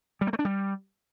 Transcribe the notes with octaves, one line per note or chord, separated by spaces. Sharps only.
G3
A#3
A3
D4
G3